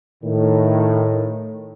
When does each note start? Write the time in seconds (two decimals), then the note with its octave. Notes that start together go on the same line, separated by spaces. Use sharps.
0.24 A2 D#3